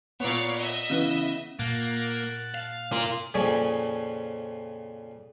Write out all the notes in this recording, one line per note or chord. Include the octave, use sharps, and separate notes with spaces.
A#2 B3 C#5 D5 F5
D#5 E5
C#3 E3 B3
A#2 A#3 F#5 A5
F5
F4 A#4
F2 A#2 C#3 C#4